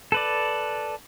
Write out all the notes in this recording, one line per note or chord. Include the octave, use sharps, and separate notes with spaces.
A4 B4 D5